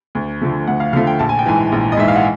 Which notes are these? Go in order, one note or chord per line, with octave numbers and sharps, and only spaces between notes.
D2
D3 F3 A3
D2 F#5
F5
D3 F3 A3 F5
G5
A#1 A5
G#5
G5
G#2 E3 G#5
A#1
D#5
G#2 E3 E5
F5
F#5